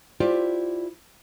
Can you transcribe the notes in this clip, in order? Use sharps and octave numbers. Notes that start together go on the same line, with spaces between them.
E4 F4 G4 C5 D5